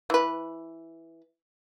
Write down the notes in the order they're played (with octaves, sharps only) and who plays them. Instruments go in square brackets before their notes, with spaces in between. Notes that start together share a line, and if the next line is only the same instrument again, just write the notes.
[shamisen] E3 B4